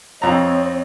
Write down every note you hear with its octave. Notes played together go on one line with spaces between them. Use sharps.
F2 C4 C#5 D#5 A#5